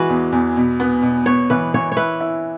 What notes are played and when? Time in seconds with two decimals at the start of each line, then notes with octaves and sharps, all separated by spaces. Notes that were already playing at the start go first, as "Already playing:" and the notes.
Already playing: E3 G#3 F#4 B4
0.09 E2
0.32 E2
0.56 B2
0.80 B3
1.03 B2
1.26 B3 C#5
1.50 E3 B4
1.74 E3 C#5
1.92 C#5
1.97 E4 B4
2.20 E4